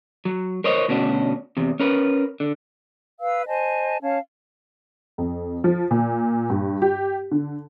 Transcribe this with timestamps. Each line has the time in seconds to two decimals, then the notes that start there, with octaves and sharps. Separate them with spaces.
0.25 F#3
0.64 A#4 C5 C#5 D#5
0.88 D2 B2 C#4 D4 F#4
1.57 E2 C3
1.80 C#4 A#4 B4
2.40 D3
3.20 B4 F5 E6
3.47 C5 D#5 G#5 A5
4.02 C#4 C#5 F5 A5
5.18 F2
5.64 F3
5.91 A#2
6.50 G2
6.82 G4
7.31 D3